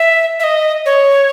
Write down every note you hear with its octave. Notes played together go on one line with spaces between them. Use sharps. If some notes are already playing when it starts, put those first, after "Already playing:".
Already playing: E5
E5
D#5
C#5